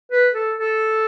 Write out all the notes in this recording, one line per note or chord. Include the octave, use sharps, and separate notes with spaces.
B4
A4
A4